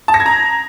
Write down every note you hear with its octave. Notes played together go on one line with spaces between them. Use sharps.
A5
A#6
G#6
A#5